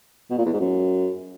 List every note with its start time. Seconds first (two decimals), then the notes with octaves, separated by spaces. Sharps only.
0.30 B2
0.38 A#2
0.45 E2
0.53 G#2
0.60 F#2